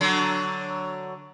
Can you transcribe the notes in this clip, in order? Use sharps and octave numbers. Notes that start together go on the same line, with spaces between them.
D3 F#3